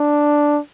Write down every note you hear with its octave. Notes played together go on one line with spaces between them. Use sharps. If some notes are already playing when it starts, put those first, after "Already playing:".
Already playing: D4